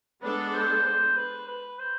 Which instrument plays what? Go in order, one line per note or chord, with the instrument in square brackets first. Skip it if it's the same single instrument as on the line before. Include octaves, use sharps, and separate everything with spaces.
[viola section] G#3 B3 D4 A4 [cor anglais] B4
[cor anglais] C5
C5
B4
B4
C5